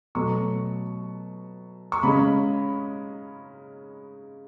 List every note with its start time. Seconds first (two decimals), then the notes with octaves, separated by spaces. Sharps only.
0.15 B2 F#3 A3 C#6
1.92 C#6
2.03 C#3 G#3 C#4 B5